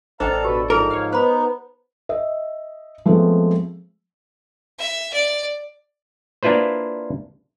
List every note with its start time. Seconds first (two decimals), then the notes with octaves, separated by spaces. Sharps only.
0.20 A1 D4 A4 C5 D#5 F5 G5 A#5
0.45 B2 G4 B4
0.70 G#2 F3 G#4 A#4
0.90 C#5 F5
1.13 B3 D#4 B4 C5 B5
2.09 D#5 E5
3.06 F3 G#3 A3 B3 C4
4.79 E5
5.13 D5
6.43 A#3 D4 E4 F4 B4 C5